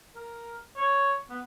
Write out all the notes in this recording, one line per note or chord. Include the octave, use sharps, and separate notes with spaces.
A#4
C#5
B3